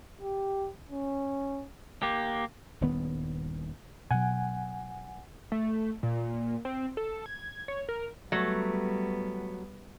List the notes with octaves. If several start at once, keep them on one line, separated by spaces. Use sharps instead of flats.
G4
C#4
A#3 G4
D#1 G2 D#3 B3
B2 F#3 F#5 G#5
A3
A#2
C4
A4
G#6
C#5
A#4
F#3 G3 A3 B3